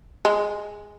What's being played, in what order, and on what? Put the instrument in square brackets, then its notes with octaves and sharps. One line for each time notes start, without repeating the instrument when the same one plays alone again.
[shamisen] G#3